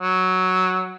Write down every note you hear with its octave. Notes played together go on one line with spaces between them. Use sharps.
F#3